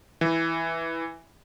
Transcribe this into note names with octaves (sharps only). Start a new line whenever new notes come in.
E3